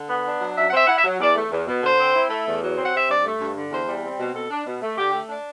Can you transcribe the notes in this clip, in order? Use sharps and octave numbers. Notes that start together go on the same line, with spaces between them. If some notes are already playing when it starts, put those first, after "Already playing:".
Already playing: D3
B3
D4
F#3
F#2 E5
F#5
C4 E5
E4 F#5
E5
F#3
E2 D5
A3
E2
B2
D3 C5
C4
E4
A3
E2
F#3
C4
F#5
C3 E5
G2 D5
A3
G2
D3
E2 C5
G3
C4
B2
B2 A4
D4
B2
A3
D3 G4
A3
D4